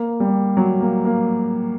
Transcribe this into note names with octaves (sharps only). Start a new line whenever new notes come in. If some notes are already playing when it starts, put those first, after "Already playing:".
Already playing: A#3
G3
F#3
A#3
A#3